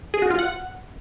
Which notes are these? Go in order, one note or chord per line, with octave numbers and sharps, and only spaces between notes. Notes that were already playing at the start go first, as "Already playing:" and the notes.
G#4
F#4
F4
F#5